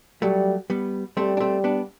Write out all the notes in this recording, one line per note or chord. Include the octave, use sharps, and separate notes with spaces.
F#3 G3 A3
G3 B3
G3 A3 C4
D4
A3 C4
B3 D4